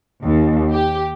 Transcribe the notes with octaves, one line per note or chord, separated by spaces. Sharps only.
D#2
G4